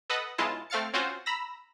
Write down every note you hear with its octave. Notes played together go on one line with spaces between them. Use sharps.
A4 B4 D#5 F#5
B1 G#3 E4 F4 A5
A3 C4 F5 F6 A6 C#7
C4 C#4 F4 F#4 C5
A#5 B5 E6 A#6